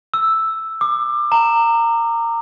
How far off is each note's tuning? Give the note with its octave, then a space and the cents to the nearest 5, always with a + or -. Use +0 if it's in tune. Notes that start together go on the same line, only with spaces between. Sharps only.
E6 +0
D6 +25
A#5 -20